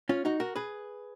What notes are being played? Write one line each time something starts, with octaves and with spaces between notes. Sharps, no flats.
C#4 F4
D#4 F#4
F#4 A#4
G#4 B4